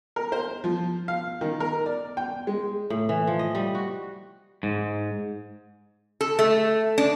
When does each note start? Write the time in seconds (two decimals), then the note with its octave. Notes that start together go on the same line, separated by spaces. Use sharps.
0.16 A#4
0.32 C5
0.64 F3
1.08 F5
1.41 D#3
1.60 A#4
1.86 D5
2.17 G5
2.47 G#3
2.90 A2
3.09 E3
3.27 F3
3.39 D#5
3.55 G3
3.75 F#4
4.63 G#2
6.21 A4
6.39 A3
6.98 D4